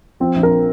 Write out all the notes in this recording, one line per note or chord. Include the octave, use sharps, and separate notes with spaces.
F3 C4
A#1
A#4